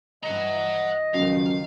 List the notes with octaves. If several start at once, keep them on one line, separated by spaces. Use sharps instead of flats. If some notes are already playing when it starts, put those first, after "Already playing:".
G2 E3 D#5 F#5 A#5
C#2 F#2 D#3 F3 F5